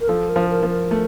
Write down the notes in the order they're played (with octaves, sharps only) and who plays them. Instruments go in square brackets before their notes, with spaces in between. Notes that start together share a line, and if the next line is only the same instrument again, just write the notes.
[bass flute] A#4
[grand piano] F3 [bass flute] A4
[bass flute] A#4
[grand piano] F3
[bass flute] A#4
[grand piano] F3
[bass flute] A#4
[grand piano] A3